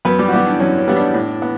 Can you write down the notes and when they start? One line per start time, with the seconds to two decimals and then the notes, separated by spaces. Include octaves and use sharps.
0.05 F#2 B3 B4
0.19 G3 G4
0.29 F#4
0.32 E3 G3 B3 G4
0.46 D4
0.60 F#2 C#4
0.78 C#4
0.87 E3 G3 B3
0.96 D4
1.14 A2
1.42 B3